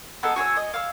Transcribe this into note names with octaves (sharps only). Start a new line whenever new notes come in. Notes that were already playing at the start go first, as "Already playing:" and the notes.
B3 D#4 G#4 A4
F#4 G#4 C#5 E6
D#5
F5 E6